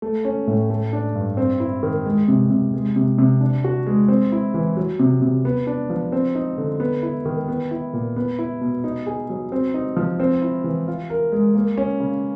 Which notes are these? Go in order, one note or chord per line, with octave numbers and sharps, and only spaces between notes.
A3
C#4
A2
A3
D4
G2
C4
E4
D#3
G#3
C3
C3
G#3
C3
C3
D4
F#4
G#3
C4
E4
E3
F#3
C3
C3
B3
D4
F3
C4
D#4
D3
B3
E4
D#3
B3
E4
A#2
B3
E4
B2
D#4
G#4
F#3
C4
D#4
F3
C4
E4
E3
F4
A#4
G#3
A#3
C#4
C#3